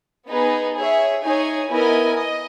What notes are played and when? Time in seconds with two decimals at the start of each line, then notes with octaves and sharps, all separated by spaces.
0.29 B3 D#4 G#4 B4
0.76 G#4 C#5 E5
1.23 D#4 G#4 C#5 G#5
1.70 B3 E4 A#4 D#5 G#5
2.18 D#5